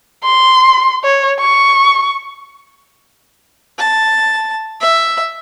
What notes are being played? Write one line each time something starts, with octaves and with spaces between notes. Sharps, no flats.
C6
C#5
C#6
A5
E5